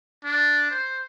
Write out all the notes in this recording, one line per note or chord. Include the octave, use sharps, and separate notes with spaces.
D4
C5